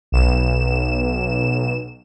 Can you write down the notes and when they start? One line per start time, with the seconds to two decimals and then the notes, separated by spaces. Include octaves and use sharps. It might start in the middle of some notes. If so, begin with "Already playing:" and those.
0.12 B1 E7